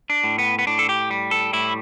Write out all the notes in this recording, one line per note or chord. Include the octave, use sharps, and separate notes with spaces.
D4
A2
B3
B3
A2 D4
A4
G4
G3
A4
A2 E4